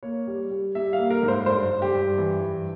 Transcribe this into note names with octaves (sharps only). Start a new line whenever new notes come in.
A#3 C#5
G3
G3
G3 E5
F5
A#3
A#4
G#2
C5
G2 C5
G2
G4
G2
E3
G2